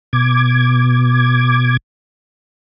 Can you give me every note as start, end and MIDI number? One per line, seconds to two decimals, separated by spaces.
0.13 1.77 47
0.13 1.77 86
0.13 1.77 92